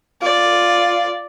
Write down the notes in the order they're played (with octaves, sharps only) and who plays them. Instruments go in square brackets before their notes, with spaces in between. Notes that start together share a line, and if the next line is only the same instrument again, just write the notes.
[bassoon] F4 [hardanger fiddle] D5